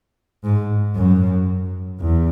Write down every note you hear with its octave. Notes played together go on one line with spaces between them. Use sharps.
G#2
F#2
E2